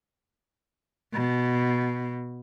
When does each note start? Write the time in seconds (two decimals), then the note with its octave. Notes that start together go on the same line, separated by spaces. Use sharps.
1.14 B2